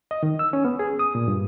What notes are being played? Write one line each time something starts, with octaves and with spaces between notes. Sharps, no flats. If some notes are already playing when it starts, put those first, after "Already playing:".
D#5
D#3
E6
C#4
B3
G#4
D#6
A#2
G2